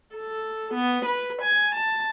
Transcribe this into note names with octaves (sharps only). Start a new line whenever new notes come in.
A4
B3
B4
G#5
A5